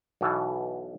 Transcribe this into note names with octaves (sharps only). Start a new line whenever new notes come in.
B1 B2 E3 A4